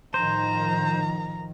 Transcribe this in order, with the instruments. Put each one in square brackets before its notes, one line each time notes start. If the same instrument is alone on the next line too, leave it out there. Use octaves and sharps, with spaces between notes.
[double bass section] A2 D#3 F3 [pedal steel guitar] C5 [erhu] A#5